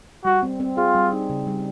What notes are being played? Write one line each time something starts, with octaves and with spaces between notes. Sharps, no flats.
G3 F#4
C4
C4
F4 G#4
G3
D#4
C#3
G3